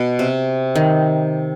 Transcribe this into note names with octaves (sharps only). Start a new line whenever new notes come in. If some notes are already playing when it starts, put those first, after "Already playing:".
Already playing: B2
C3
D#3